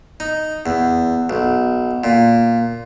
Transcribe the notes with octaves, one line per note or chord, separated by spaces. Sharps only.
D#4
E2
B1
A#2